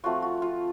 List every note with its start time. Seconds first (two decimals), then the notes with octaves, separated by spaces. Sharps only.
0.04 F3 A3 C4 F4 F#4
0.22 F#4
0.42 F4